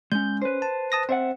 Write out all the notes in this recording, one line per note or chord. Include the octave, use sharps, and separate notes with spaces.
G#3 C#4 G6
C#4 B4 C5
A5
A5 D#6 A#6
C4 C5 E5 F#5